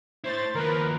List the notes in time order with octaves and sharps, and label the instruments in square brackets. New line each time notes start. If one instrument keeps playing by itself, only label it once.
[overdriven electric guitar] E4 C#5 [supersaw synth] C5 A6
[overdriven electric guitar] D#2 F3 [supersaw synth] A#4 B4